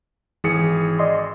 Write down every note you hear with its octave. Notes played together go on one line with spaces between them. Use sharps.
G#1 E3 G#4 C#7
D5 D#5 C6